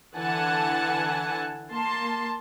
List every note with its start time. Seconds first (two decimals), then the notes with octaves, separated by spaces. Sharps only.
0.15 D3 E3 F#5 G#5 A5
1.72 A#3 A5 C6